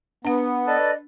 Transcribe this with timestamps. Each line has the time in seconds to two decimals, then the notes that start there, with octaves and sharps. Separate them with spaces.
0.25 B3 D4 F#5
0.67 A4 B4 D5 D#5 A5